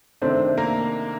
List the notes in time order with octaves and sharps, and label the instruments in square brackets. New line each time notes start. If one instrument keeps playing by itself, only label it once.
[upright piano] C3 D#3 A3 C4 D4 C5
A#3 A#4